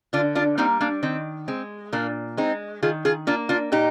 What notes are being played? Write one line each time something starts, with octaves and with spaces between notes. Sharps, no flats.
D3 D4 F4
D4 F4
G3 A#3 C4 D#4
A#3 D4
D#3 C4
G#3 C4
A#2 A#3 D4
G#3 C4 D#4
D#3 F4 G#4
F4 G#4
A#3 D4 F4
D4 F4
A#2 D#4 G4